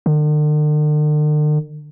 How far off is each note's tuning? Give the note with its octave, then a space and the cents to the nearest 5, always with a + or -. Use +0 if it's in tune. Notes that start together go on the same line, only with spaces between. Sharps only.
D3 +45